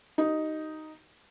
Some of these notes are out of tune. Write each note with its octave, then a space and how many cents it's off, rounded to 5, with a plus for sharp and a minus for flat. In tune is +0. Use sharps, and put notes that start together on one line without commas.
D#4 +0 G4 -45